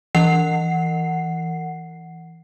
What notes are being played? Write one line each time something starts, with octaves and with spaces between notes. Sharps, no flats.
E3 F#5 C7